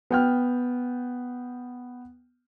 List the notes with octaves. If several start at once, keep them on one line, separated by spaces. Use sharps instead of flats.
B3 G5 F6